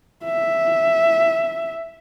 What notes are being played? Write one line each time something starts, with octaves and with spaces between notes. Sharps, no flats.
E5